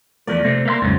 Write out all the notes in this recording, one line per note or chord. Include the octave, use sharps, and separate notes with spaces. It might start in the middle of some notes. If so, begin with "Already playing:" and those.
E2 F3 A3 D5
C3 A3 C4
A#3 E5 C6
A#1 F2 G#2 C#3 F#3